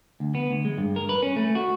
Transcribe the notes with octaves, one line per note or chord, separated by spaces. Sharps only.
D2
B3
D2
G#3
G2
A#4
B4
C#4
A3
F#4